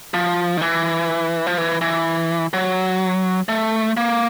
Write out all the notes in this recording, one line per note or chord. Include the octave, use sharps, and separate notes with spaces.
F3
D#3
E3
F3
E3
E3
F#3
A3
A#3